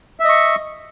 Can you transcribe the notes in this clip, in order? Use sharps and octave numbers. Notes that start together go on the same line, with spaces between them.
D#5 E5 C#6